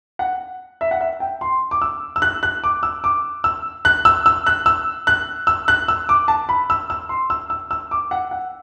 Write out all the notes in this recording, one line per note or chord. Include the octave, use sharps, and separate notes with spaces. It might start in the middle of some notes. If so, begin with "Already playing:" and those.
F#5
E5
F#5
E5
G5
C6
D6
E6
E6
F#6
F#6
D6
E6
D6
E6
F#6
E6
E6
F#6
E6
F#6
E6
F#6
E6
D6
A5
B5
E6
E6
C6
E6
E6
E6
D6
F#5
F#5